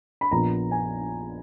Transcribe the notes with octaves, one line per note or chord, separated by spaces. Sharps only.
B5
A#1 A#2 F3 B3 A#5
G#5